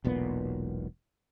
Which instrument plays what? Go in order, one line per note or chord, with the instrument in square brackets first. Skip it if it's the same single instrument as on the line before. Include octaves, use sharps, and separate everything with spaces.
[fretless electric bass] E1 B1 A#2 B3